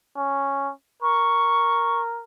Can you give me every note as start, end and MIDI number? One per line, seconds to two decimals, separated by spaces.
0.17 0.71 61
1.02 2.23 70
1.02 2.01 85